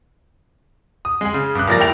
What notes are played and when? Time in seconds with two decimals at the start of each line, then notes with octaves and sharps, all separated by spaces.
1.05 D#6
1.21 G#3 G#4
1.34 C#3
1.55 G2 F#6
1.68 F#1 F3 G3 A#4 A6 A#6
1.80 D1 E4 G5 A6 F7